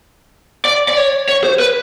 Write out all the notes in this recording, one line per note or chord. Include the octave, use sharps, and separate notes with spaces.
D5
D5
C#5
C#5
C5
B4